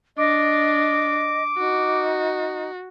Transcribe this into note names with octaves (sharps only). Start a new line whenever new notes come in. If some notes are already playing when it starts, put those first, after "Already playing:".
D4 D#5 D6
D#4 F#4